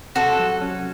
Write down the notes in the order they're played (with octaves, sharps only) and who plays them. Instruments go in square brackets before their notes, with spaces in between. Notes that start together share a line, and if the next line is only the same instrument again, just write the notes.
[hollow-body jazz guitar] C3 [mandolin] F#4 A4
[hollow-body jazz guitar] F#3
C#4